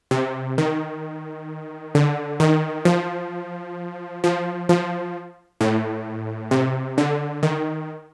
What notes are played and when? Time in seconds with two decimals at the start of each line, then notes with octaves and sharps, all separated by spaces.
0.11 C3
0.58 D#3
1.95 D3
2.40 D#3
2.85 F3
4.24 F3
4.69 F3
5.61 A2
6.51 C3
6.98 D3
7.43 D#3